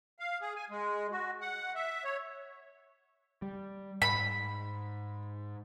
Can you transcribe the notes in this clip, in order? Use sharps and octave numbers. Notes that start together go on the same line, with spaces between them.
F5
G#4
G#5
G#3
F#4
F#5
E5
C#5
G3
G#2 B5